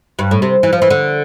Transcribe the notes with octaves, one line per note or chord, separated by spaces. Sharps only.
G2
A2
C3
E3
F3
E3
D3